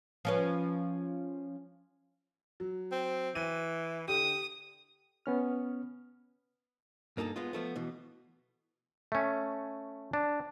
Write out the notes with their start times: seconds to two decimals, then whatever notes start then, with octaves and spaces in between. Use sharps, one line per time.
0.25 F3 C#4 B4
2.60 F#3
2.92 C4
3.35 E3 D#7
4.08 D3 G4 D#6
5.26 B3 C#4 F6
7.17 G2 A#3 D#4 G#4 A4
7.36 G#3 B3 F4
7.53 F3 A3 B3
7.76 B2 E3
9.12 A3 C#4
10.13 D4